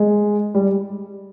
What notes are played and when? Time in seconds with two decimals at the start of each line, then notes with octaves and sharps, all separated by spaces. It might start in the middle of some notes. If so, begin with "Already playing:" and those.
Already playing: G#3
0.55 G3